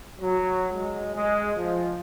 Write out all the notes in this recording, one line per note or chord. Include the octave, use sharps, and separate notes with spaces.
F#3
G#3
G#3
F3